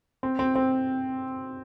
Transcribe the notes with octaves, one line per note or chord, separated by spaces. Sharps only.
C4
C4
C4